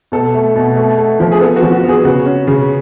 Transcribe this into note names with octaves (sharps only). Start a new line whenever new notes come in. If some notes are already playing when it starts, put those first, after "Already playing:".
B2 A4
A3
B2
A3
A3
F3
G#4
B3 A4
F#4
F3
F#4
B3 G#4
C#3 F#4
C#4
C#3